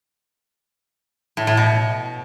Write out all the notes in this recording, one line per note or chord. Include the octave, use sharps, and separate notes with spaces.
A2
A2
B2